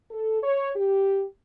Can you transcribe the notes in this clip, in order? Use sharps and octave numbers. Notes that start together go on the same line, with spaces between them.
A4
C#5
G4